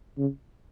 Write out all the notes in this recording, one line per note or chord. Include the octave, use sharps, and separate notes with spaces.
C#3